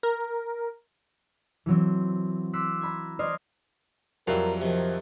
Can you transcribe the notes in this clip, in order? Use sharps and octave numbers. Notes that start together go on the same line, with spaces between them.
A#4
E3 F#3 C4
C6 D6 E6 F#6 B6
A#5 B5 G#6
C5 D5 D#5 F6 G#6 A#6
F2 F#3 G3 E4 A#4 F5
C3 D#3 F3